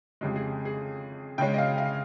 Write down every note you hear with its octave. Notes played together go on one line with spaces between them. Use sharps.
F2 C#3 G#3 G4
G#4
G#4
C#3 G#3 C#4 G5
D#5
F5
F5